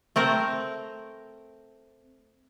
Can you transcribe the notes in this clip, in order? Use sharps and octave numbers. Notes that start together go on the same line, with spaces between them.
A3 C4 A#4